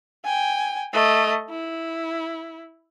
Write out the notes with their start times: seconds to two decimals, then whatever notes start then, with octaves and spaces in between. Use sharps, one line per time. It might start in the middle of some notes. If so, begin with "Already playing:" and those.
0.25 G5 G#5
0.93 A3 D#5
1.50 E4